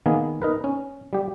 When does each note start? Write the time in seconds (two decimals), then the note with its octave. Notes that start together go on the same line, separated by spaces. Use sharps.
0.06 D#3 A#3 B3 G#4
0.42 D#4 A#4 B4
0.64 C#4
1.13 G3 G4